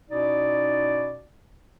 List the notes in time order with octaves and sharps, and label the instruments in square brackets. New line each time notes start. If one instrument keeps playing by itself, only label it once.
[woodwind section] B2 C#4 D#4 E4 D5